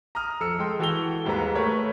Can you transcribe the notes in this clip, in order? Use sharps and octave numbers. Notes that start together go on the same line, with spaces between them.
A#5 D#6 F6
F2 A4 E6 C#7
G#3 G5 C6
E3 F#4 A4 G5 F7 G7
D#2 G#2 G3 B4 A#5
A3 A#4 B4 C#5